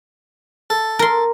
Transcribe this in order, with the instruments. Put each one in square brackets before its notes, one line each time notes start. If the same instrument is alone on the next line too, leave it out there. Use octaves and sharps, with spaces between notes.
[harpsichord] A4
[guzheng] A#4 C6